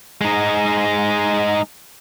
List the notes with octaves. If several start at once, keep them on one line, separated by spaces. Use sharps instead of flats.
G#3 D#4